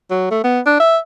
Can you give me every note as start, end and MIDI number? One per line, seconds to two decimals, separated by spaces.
0.10 0.28 54
0.31 0.41 57
0.44 0.60 59
0.66 0.76 62
0.80 0.98 76